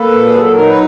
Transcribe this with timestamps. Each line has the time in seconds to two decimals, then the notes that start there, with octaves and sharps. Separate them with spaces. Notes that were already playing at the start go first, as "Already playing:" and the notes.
Already playing: A#3 A4 B4
0.10 A#2
0.26 G#4
0.34 F#3 A4
0.52 D#4 A#4
0.66 B4